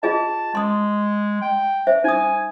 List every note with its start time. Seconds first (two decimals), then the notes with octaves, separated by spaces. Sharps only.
0.03 F4 G#4 D#5 A5
0.55 G#3 C6 D#6
1.42 G5
1.87 C5 E5
2.04 D#4 G#5 D#6